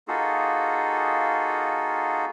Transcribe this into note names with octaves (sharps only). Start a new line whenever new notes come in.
A#3 D#4 F4 F#4 G#4 A4